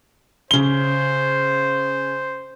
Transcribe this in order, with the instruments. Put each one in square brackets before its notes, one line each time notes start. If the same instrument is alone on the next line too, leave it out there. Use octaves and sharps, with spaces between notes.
[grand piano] C#3 G7 [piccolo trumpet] C5